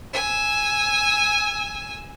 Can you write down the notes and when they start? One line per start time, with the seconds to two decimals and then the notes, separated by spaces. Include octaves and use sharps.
0.13 G#5 E6